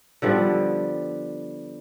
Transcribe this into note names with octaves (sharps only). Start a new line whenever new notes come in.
D3 F3 G3 B3